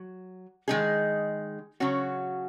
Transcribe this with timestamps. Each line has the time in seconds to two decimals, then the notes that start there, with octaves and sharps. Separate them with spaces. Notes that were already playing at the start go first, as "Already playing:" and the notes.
Already playing: F#3
0.68 D#3 G#3 D#4 G#4
1.80 C#3 F#3 C#4 F#4